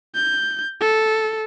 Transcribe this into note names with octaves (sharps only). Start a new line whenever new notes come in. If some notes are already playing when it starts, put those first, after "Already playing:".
G6
A4